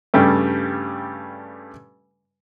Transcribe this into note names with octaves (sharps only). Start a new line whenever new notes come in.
G2 C#3 G3 A3